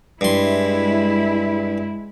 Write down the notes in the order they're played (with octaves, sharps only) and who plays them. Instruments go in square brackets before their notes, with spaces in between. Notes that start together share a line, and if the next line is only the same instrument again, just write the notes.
[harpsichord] G2 C6 [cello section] G#3 E4